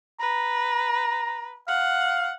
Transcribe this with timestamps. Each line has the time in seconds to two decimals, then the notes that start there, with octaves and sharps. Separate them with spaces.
0.20 B4 A#5
1.68 F5 F#5